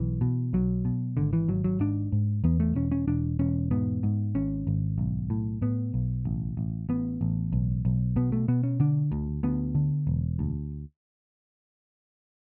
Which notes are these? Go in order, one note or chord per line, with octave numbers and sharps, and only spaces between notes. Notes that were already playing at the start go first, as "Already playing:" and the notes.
Already playing: B1 E3
B2
B1 F#3
B2
G#1 D3
E3
G#1 F#3
F#3
G#2 D4
G#2
E2 B3
A3
E1 C#4
C#4
E1 D4
E1 C#4
G#2 B3
G#2
G#1 C#4
G#1
B1
A2
A2 B3
B1
A1
A1
A1 B3
A1
B1
B1
B2 B3
A3
B2 B3
C#4
D3 D4
D2
D2 B3
D3
E1
D2